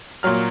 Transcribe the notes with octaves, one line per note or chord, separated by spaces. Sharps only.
A#2 F#3 F6